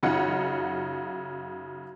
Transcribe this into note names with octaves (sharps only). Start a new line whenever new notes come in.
F#2 C#3 D#4 F4 F#5